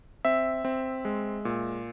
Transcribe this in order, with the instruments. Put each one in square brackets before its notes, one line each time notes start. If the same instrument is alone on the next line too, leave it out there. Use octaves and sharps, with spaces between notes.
[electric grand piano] C4 E5
C4
G#3
A#2